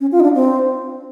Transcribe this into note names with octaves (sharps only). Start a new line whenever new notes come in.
C#4
F4
D#4
D4
C4